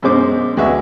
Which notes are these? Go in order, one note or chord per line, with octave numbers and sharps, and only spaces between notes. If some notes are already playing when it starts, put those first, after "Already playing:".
F#2 B2 G#3 C5 D6
D2 G#3 F#4 B4 E5